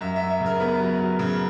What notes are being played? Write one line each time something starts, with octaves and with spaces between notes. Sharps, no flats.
F#2 E5
E5
F#2
E5
C#3
A#4
B3 B4
F#3
F#3
C#3